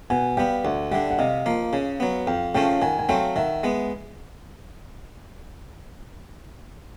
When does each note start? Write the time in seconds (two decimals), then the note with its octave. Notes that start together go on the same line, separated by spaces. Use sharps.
0.10 B2 F#5 G#5
0.37 G3 B3 F5 G5
0.64 D2 E5 F#5
0.91 D3 G3 E5 F#5
1.11 F#5
1.18 C3 D#5 F5
1.46 F3 A#3
1.73 C#3
2.00 F#3 B3
2.27 F2 F5 G5
2.55 C#3 F3 A3 C#4 F5 G5
2.82 D#3 F#5 G#5
2.99 G#5
3.09 F#3 A3 C4 F5 G5
3.36 D#3 E5 F#5
3.63 G#3 B3